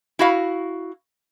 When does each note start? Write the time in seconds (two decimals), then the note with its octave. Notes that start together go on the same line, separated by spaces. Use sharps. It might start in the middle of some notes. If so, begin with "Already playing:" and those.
0.19 E4 F#4 F5